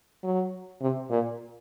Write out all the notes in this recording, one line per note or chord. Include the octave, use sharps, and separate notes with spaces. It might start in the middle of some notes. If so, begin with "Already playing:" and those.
F#3
C3
A#2